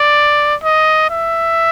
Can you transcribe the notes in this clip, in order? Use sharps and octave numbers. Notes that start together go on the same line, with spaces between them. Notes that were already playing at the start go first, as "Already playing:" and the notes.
Already playing: D5
D#5
E5